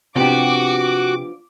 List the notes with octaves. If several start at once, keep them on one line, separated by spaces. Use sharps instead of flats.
C3 F3 B3 D4 F#4 G4 D6